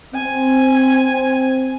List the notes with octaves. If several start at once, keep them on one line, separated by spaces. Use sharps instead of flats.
C4 G#5